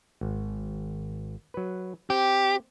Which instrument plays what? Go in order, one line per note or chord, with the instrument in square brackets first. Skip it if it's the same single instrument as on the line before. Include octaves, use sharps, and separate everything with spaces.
[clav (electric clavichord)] G#1
F#3 B4
[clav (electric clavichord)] C4 [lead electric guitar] G4